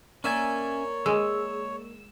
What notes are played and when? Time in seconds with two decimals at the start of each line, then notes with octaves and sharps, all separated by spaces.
0.24 A#3 C#4 C#5 D5 E5 G#5
1.06 G#3 E6